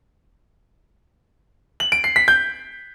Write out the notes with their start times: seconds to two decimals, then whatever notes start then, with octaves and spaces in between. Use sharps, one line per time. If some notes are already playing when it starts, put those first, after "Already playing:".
1.80 F#7
1.92 D7
2.04 C7
2.16 B6
2.28 G6